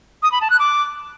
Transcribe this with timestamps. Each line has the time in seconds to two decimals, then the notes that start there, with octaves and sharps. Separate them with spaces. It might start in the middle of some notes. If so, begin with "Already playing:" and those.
0.23 D#6
0.32 B5
0.41 A5
0.50 F#6
0.59 D6